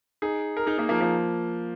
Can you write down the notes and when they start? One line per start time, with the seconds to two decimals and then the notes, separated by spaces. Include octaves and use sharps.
0.22 D#4 G#4
0.57 A#4
0.66 D#4 G#4
0.78 A#3 D#4
0.89 F3 A#3
1.01 F3 A#3